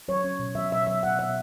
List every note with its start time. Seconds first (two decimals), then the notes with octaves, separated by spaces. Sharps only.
0.08 F#3 C#5
0.24 C#4
0.39 B2
0.55 F#3 E5
0.71 B2 E5
0.87 F#3 E5
1.03 B2 F#5
1.19 B2 E5